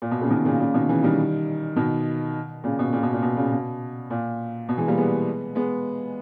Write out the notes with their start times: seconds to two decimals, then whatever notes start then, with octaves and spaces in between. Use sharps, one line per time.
0.02 A#2
0.11 B2
0.21 A#2 C#3
0.30 B2 D#3
0.45 A#2 C#3
0.60 A#2 C#3
0.74 B2 D#3
0.89 C#3 E3
1.03 D#3 G3
1.76 B2 D#3
2.64 A#2 C#3
2.79 B2
2.93 A#2 C#3
3.03 B2
3.13 A#2
3.22 B2
3.37 A#2 C#3
3.52 B2
4.11 A#2
4.69 B2
4.78 E3 G#3
4.87 G3 A#3
4.98 G#3 B3
5.55 G#3 B3